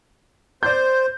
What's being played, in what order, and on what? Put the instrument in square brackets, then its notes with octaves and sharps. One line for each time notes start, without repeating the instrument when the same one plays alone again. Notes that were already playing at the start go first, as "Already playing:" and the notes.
[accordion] C5 [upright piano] D5 G6